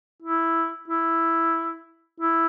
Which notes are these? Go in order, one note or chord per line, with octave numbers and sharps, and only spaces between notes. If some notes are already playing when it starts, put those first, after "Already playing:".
E4
E4
E4